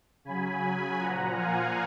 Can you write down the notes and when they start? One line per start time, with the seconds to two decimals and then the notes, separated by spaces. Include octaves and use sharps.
0.25 C#3 F#3 G#5 B5
0.98 A#2 F3 F#5 A#5
1.34 F5 G#5